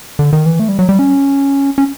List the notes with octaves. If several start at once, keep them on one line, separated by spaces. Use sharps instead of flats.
D3
D#3
E3
A3
G3
F#3
G3
C#4
C#4